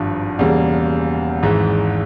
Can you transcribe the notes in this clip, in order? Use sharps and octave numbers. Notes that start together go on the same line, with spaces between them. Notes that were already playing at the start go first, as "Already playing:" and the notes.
Already playing: G#1 G2 F3
E1 E2 C#3 G3 A#3
G#1 G#2 E3